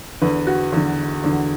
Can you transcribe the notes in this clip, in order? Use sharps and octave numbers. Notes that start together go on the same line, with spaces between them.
E2 D3 B4
F#4
E2 D3
E2 D3